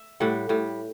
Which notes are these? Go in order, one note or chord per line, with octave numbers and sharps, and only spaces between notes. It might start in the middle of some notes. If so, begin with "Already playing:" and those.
Already playing: E5
A2 G3 F#5
A2 G3